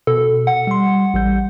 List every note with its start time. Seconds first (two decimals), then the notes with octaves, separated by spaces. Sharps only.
0.07 B2 A4
0.47 F#5
0.67 G3 C6
1.14 A1 G3 G6